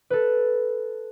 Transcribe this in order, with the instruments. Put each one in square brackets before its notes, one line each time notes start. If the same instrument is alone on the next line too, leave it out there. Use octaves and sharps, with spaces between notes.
[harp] A4 B4